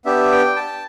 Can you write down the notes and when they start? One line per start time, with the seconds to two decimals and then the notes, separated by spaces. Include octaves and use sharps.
0.05 B3 D4 G4 E5
0.32 G5
0.56 A5